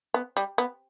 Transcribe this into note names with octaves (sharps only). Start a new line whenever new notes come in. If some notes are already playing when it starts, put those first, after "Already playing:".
B3
G3
B3